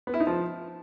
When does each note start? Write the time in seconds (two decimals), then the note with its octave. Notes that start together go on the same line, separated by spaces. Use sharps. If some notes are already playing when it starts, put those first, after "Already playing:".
0.07 B3
0.14 E4
0.20 D#4
0.27 F3